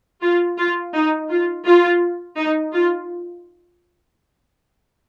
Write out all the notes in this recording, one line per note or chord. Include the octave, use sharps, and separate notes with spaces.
F4
F4
D#4
F4
F4
D#4
F4